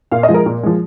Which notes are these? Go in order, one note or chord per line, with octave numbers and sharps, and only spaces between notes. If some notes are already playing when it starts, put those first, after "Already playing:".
A#2 F5
D#5
F3 G#3
A#4
A#2
F3 G#3